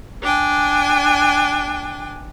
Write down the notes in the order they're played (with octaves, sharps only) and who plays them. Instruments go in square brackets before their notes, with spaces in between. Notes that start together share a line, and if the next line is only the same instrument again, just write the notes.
[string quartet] D4 G5 G#5